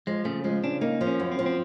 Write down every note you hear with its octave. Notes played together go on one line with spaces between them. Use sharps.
F3 G#3
C#3 A3
F3 G#3
C#3 D4
A#3 D#4
F3
C#4
F#2
C4
F3
C4